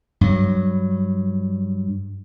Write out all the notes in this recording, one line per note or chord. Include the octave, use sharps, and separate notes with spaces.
G2 F#3